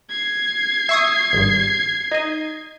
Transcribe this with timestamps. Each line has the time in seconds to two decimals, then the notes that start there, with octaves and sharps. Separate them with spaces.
0.10 G#6 C7
0.89 E5 C#6 D#6
1.33 G#1 G2
2.11 D#4 D#5